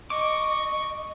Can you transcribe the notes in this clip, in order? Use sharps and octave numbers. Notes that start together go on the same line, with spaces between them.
D#5 C#6 D6